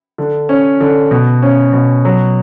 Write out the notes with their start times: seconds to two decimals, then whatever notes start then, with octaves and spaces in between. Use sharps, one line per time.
0.18 D3
0.49 C#4
0.81 D3
1.11 B2
1.42 C#4
1.73 B2
2.05 F#3